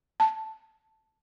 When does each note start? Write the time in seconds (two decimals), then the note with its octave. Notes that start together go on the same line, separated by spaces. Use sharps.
0.20 A5